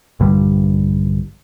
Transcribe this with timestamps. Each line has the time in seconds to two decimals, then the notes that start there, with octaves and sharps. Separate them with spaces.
0.20 A#1 G2 D3 G3